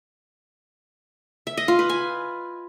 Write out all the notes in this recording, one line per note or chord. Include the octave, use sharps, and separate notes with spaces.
E5
D#5
F4
B4
G#5